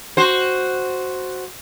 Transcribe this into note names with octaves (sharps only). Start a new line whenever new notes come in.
F#4 C5